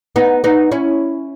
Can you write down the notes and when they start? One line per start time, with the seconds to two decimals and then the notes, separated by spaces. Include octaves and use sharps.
0.16 B3 D#4
0.44 B3 D#4
0.72 C#4 E4